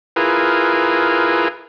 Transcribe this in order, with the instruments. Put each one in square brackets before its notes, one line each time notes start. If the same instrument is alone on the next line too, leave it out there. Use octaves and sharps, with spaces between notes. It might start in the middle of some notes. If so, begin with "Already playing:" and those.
[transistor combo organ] E4 F4 G#4 A#4 B4